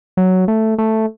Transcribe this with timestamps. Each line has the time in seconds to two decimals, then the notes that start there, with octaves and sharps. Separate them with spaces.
0.17 F#3
0.48 A3
0.78 A3